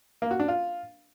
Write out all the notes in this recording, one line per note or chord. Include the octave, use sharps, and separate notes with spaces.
A#3
F#4
D4
F4